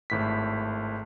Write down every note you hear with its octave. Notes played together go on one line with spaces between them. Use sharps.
G#1 A2 B6